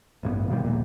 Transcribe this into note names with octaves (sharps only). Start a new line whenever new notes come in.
A1 G2 A#3 B3
B2 D#3 F3 G3
D#1 A#1 A#2